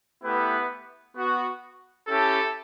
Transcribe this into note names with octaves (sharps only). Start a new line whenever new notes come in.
A3 B3 E4 G4 B4
B3 F#4
C#4 E4 G4 A4